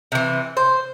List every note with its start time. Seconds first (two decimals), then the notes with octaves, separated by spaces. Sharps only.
0.12 C3 E3
0.57 C5